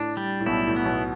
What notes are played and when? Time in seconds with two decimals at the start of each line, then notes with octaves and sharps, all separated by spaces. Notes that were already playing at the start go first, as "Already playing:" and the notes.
Already playing: A2 D4
0.17 G3
0.40 A2
0.46 B1 B2 E4
0.67 A2
0.76 B3
0.86 B1 B2